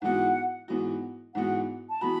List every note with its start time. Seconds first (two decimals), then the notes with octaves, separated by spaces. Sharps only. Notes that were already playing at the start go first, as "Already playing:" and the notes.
0.02 G#2 E3 B3 F#4 F#5
0.68 G#2 E3 B3 F#4
1.35 G#2 E3 B3 F#4 F#5
1.89 A5
2.01 E3 B3 F#4 B5